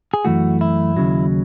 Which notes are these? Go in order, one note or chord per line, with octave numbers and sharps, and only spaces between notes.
G#4
F#2 E3 A3 F#4
E4
D#2 C#3 F#3